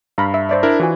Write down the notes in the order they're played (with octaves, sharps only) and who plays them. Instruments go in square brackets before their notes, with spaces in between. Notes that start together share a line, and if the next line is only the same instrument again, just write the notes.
[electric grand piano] G2 [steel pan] F5 A#5 B5
[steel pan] E5
C5 D5 E5
[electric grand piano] D4 E4 A#4
[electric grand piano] E3 [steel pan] F4 F#4 G#5